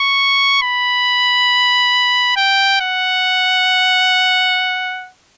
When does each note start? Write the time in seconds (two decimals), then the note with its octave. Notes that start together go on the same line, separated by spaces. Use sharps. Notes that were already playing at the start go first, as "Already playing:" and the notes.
Already playing: C#6
0.62 B5
2.37 G5
2.81 F#5